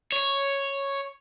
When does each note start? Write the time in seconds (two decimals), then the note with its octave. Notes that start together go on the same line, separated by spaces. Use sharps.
0.12 C#5